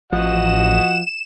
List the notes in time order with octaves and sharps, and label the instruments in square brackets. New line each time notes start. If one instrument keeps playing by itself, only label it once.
[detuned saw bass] A1 [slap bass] F3 [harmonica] F#4 D#5 F#5 [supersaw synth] E7